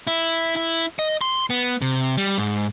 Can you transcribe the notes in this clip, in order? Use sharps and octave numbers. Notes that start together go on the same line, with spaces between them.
E4
E4
D#5
C6
B3
C3
G3
G#2